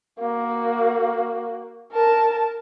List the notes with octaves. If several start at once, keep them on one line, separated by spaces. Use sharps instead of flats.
A#3 F#4
A#4 A5